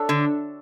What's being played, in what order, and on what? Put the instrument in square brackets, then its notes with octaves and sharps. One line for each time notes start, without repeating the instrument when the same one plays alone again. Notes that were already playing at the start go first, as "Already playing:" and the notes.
Already playing: [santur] D4 A4 C#5 E5
[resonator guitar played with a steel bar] D3